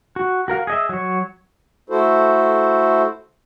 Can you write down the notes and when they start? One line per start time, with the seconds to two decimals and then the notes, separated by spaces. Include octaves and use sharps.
0.16 F#4
0.48 F#4 A#4 F5
0.67 G#4 D#5 E5
0.89 F#3 C#5
1.90 A3 E4 F#4 A4 C5